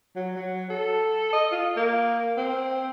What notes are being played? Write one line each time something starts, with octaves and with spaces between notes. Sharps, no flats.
F#3
F#3
A4
D#5
F4
A#3
C4